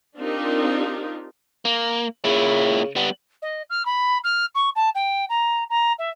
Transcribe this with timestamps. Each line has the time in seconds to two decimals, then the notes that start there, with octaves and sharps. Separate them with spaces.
0.17 C4 D4 D#4 F4 G4 A#4
1.65 A#3
2.25 A#2 C#3 E4
2.96 G3 B3
3.42 D#5
3.70 F6
3.86 B5
4.24 F6
4.55 C#6
4.76 A5
4.95 G5
5.30 A#5
5.70 A#5
5.99 E5